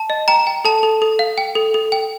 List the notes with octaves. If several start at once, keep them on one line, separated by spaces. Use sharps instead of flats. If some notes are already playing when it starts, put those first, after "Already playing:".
Already playing: A5
D#5
G5 A#5
G5
A4 A5
A4
A4
F5
G5
A4
A4
G5